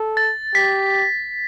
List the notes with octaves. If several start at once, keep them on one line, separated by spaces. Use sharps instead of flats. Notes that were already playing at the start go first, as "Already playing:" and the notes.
Already playing: A4
A6
G4 B6